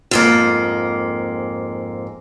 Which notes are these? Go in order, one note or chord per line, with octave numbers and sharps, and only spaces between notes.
F2 G#2 A#3